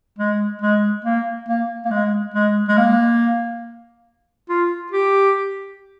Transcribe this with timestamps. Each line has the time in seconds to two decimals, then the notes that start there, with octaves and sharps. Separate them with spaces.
0.18 G#3
0.61 G#3
1.05 A#3
1.48 A#3
1.85 A#3
1.91 G#3
2.34 G#3
2.68 G#3
2.77 A#3
4.49 F4
4.91 G4